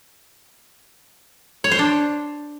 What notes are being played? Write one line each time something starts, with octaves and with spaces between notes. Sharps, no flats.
C#5
C5
D4